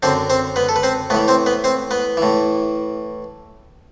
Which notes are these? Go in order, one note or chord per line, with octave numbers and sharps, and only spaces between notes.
F#2 D3 C4 C5
C4 C5
B3 B4
A4
B4
C4 C5
A2 E3 B3 B4
C4 C5
B3 B4
C4 C5
B3 B4
A2 E3